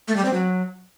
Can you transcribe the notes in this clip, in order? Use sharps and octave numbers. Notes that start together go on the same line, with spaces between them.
A3
G3
C4
F#3